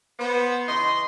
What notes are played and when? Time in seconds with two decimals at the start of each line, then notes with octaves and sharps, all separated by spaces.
0.19 B3 C5
0.68 C#3 E3 D#5 C6